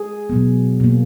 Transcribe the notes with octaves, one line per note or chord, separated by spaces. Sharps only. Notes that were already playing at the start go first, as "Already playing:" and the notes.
Already playing: G#4
B2 F#3 B3
B2 A#3